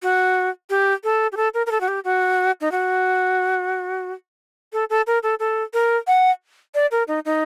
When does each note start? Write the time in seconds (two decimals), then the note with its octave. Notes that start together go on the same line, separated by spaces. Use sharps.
0.02 F#4
0.70 G4
1.04 A4
1.32 G4
1.37 A4
1.54 A#4
1.66 A#4
1.71 A4
1.81 F#4
1.88 G4
2.04 F#4
2.61 D#4
2.72 F#4
4.73 A4
4.90 A4
5.07 A#4
5.23 A4
5.40 A4
5.74 A#4
6.07 F#5
6.74 D5
6.91 A#4
7.08 D#4
7.25 D#4